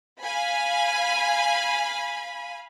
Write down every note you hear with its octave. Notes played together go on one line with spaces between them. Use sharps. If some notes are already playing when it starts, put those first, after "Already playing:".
F5 G#5 B5